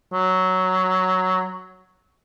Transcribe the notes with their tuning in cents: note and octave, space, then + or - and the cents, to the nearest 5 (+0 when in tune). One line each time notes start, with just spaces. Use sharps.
F#3 +5